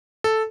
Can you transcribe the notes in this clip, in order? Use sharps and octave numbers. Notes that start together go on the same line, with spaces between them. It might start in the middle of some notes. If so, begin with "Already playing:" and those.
A4